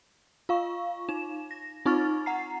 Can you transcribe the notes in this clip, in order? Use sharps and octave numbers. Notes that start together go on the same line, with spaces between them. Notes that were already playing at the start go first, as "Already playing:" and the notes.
F4 F5 C#6
D#4 E7
A#6
C4 D#4 F4 C#6 F6 A6
F#5 A#5 C7